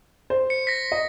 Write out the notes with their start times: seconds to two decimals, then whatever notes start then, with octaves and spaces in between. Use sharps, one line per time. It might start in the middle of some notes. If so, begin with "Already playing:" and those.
0.30 C5
0.50 C#7
0.67 A#6 B6
0.92 D#5